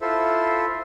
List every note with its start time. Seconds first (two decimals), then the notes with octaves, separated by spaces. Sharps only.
0.01 E4 F4 A4 C5 E5